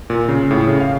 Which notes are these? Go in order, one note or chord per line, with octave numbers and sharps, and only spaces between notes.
A#2
C#3
A2
C#3
F5